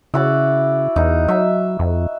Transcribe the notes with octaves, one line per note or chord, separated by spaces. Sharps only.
C#3 E4 F#4 D5
E2 D#4
F#3 E5
F2